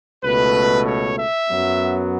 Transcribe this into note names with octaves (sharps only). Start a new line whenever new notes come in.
C#2 B2 A3 B4
C#5
E5
F#2 F#3 B3